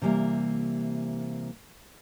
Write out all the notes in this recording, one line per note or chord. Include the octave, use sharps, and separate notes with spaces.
C3 E3 G3 G#3 A#3